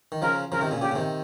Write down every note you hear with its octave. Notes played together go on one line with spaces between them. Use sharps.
D#3
C#3 F3 A#4
C#3 F3 A#4
C3 D#3
A#2 C#3
A#2 C#3 G4
C#3
C3 D#3